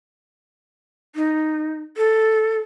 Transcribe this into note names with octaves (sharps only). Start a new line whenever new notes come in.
D#4
A4